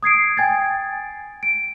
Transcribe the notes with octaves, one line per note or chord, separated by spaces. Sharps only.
D#6 G#6 C7 D7
G5 G#5 G#6 A6
D7